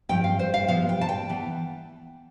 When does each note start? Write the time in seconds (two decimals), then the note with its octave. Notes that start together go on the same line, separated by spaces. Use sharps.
0.09 G2 F3 C4 G5
0.24 F5
0.39 C5
0.54 F5
0.68 C3 F3 B3 F5
0.89 G5
1.01 A5
1.09 G5
1.29 E3 B3